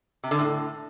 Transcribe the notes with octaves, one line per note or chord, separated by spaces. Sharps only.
C3
D3
A2